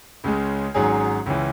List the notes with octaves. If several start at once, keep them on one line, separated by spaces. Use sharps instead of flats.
C#2 C#3 G#3
G#1 G#2 F#3 C#4 G#4
C#2 C#3 E3